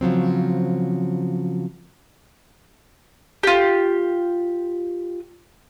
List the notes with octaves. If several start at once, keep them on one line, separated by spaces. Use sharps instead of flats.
C#3 F3 F#3 C4
F4 G4